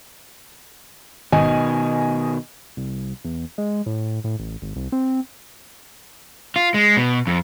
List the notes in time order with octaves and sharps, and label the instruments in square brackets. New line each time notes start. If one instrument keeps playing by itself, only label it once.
[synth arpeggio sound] G#1 [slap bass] B2 D#3 [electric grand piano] D#5 G#5
[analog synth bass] C2
E2
G#3
A2
A2
A1
G#1
C2
C4
[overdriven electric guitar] F4
G#3
B2
F2